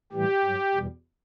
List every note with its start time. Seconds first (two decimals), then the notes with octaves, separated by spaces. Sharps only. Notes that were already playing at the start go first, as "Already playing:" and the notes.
0.13 A2 E3 G3 G4
0.44 G2 F#3
0.75 E2 B2 G3